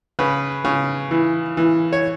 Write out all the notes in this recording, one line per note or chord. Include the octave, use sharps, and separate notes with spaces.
C#3 B4
C#3
E3
E3
C#5